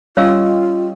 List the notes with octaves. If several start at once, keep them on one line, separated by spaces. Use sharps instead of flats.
G3 C#4 F4 C#5 D#5 F5 E6